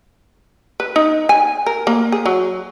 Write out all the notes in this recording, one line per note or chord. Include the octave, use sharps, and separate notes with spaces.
B4
D#4
G#5
A#4
A#3
G#4
F#3